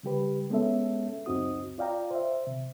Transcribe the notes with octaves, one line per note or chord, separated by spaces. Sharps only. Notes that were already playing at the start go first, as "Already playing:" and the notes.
C#3 G3 G4 B4
G#3 B3 C#4 A4 E5
C#2 F#2 C4 D#4 F#4 D#6
F4 D5 F5 G5 A#5
C5 E5
C3